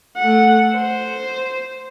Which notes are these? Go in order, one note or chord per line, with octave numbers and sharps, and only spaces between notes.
A3 F#5
C5